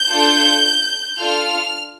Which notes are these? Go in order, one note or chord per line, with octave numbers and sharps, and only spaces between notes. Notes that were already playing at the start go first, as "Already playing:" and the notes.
Already playing: G6
D4 F4 A4
D4 F4 A4 F6